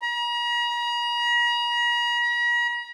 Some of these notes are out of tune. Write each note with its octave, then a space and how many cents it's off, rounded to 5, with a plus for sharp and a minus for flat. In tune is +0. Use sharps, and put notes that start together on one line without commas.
A#5 +45